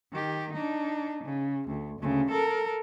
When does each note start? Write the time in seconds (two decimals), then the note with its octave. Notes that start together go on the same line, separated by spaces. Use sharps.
0.12 D#3 G4
0.53 D4 D#4
1.24 C#3
1.68 D2
2.00 D2 C#3
2.31 A4 A#4